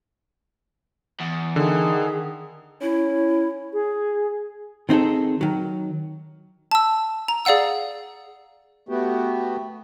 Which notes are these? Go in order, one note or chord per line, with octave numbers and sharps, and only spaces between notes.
E2
D3 D#3 G#4
C#4 E4
G#4
D#3 C4 D#4 G#4 A4
D#3 F#3
A5 E6
A#5
G#4 D5 F5 F#5 E6
A3 B3 F#4 G4